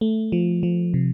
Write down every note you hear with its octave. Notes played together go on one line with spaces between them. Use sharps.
A3
F3
F3
C3